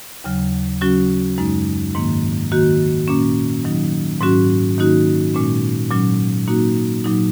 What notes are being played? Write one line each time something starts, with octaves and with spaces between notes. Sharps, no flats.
D#2 C#3 F#3
C#3 F#3 C#4 F#4
F#2 C#3 G#3 D#4
G#2 D#3 A#3
D#3 A#3 F#4
A#2 A#3 C#4
D#3 F#3 D#4
G#2 F#3 C#4 F#4
D#3 A#3 D#4 F#4
A#2 G#3 C#4
A#2 F#3 C#4
A#2 A#3 D#4 F#4
A#2 F#3 D#4